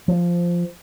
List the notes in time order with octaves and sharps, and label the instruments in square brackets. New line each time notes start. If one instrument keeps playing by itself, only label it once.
[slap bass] F3